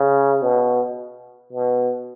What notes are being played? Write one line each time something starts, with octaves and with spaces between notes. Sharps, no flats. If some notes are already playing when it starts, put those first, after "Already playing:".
Already playing: C#3
B2
B2